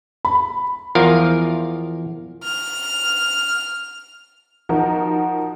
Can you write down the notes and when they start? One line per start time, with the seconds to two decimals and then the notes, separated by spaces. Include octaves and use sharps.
0.25 B5
0.95 E2 F3 A#4 F5
2.43 F6
4.69 F3 D#4 F#4 A#4